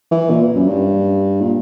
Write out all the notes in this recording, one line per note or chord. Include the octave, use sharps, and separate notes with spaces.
E3
A#2
F#2
G2
A#2